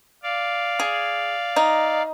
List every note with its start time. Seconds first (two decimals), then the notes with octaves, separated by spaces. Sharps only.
0.23 D5 F5
0.80 G#4
1.56 D#4